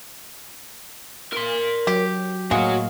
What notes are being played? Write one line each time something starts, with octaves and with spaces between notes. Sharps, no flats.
A#4 C6
F#3 G4
A2 G#3 A#3 F#4 C#5 F5